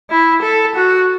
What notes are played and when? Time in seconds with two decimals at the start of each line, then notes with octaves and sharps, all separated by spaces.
0.10 E4
0.43 A4
0.76 F#4